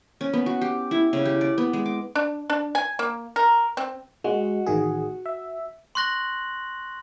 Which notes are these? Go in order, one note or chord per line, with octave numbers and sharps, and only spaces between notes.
C#4
B3
F#4
G4
E4
C#3
G4
D5
B3
G#3
D6
D4
D4
G#5
A#3
A#4
C4
G#3 F#4
A1 D#3 G#4
E5
C6 C#6 F#6 A#6 F#7